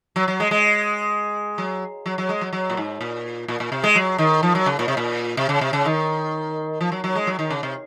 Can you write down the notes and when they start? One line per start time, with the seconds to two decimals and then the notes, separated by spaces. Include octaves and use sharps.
0.16 F#3
0.28 F#3
0.40 G#3
0.51 G#3
1.58 F#3
2.06 F#3
2.18 F#3
2.29 G#3
2.41 F#3
2.53 F#3
2.70 A#2
2.77 G#2
3.01 A#2
3.48 A#2
3.60 A#2
3.72 C3
3.84 G#3
3.95 F#3
4.18 D#3
4.43 F3
4.55 F#3
4.66 C#3
4.79 A#2
4.88 C3
4.97 A#2
5.37 C3
5.49 C#3
5.61 C3
5.73 C#3
5.86 D#3
6.81 F3
6.92 F#3
7.04 F#3
7.16 G#3
7.27 F#3
7.39 D#3
7.51 C#3
7.63 C3